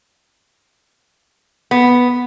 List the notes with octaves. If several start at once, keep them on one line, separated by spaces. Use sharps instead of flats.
B3